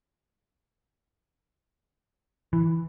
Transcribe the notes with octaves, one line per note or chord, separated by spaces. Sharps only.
E3